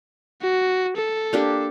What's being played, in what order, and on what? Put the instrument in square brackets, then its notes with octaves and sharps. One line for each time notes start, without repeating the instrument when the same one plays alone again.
[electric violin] F#4
A4
[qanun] A#3 D4 G4